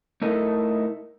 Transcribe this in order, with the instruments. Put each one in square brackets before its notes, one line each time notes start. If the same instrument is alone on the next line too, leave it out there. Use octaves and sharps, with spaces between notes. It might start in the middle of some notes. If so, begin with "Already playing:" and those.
[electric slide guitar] A3 D#4 E4 A4 A#4 D#5